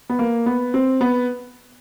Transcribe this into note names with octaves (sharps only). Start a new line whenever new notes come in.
B3
A#3
B3
C4
B3